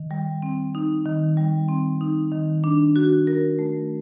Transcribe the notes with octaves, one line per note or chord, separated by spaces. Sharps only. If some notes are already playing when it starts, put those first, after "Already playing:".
Already playing: D#3
G3
C4
D#4
D#3
G3
C4
D#4
D#3
D4
F#4
A#4
A3